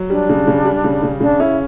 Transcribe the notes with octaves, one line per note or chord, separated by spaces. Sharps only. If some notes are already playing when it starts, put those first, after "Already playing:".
Already playing: F#3
G3 D4
C#3
C#3
G3
C#3
C#3
C#3 D4
C#4 E4